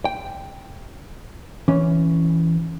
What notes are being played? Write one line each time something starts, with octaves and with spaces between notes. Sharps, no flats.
G5
E3 C#4